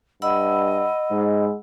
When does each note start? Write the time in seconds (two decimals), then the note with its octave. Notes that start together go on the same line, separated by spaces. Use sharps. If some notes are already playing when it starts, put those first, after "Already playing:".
0.22 G2 D#5 F#5 B5 E6
1.11 G#2 G#3